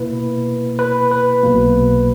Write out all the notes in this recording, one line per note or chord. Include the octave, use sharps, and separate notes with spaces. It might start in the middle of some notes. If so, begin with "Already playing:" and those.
Already playing: B2 A#3 E4 B4
B4
B4
B1 B2 A#3